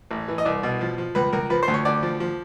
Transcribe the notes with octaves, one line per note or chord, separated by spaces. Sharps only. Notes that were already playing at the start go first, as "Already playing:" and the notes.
A1
E3
D#5
C2 D5
B2
F3
F3
C#2 B4
C#2 A#4
F3 B4
C5
D2
C#5
D2 D5
F3
F3